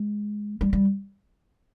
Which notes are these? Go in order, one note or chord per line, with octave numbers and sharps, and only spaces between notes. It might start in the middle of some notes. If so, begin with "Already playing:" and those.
Already playing: G#3
G3
G3